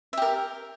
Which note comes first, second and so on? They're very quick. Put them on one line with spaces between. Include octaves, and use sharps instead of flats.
E5 G4 A#4